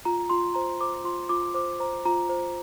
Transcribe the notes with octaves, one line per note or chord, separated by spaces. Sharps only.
F4 A#5
F4 C6
C5 A#5
C5 D6
D6
F4 C6
F4 D6
C5 D6
C5 A#5
F4 A#5
C5